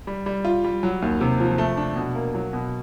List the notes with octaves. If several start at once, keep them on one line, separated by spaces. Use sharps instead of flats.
G3
G3
F4
G3
F#3
D#2
C3
F3
A3
D4
B2
A#3
F#3
B2